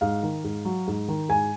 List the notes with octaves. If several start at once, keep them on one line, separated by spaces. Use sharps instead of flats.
G#2 F5
D#3
G#2
F#3
G#2
D#3
G#2 G#5